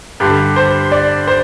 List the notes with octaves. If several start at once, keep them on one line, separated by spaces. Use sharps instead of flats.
G2 D3 G4
C5
D5
C5